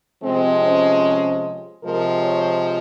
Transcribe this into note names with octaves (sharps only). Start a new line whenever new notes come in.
C3 F3 G#3 C4
C#4
C3 F3 G#3 A#4
C#5